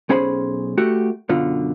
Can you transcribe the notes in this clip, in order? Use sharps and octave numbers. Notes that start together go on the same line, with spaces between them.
B1 C#4 G#4 C5 B5
A3 F#4 G4
F#2 B2 D3 F4